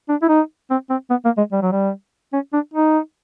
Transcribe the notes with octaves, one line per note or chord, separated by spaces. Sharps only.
D4
E4
D#4
C4
C4
B3
A#3
G#3
G3
F#3
G3
C#4
D4
D#4